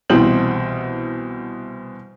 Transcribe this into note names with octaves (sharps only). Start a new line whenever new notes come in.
C2 B2 E3 C4 G6 F#7